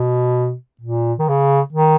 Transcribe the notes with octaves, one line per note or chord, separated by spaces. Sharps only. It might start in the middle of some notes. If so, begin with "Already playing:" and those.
Already playing: B2
A#2
D#3
C#3
D#3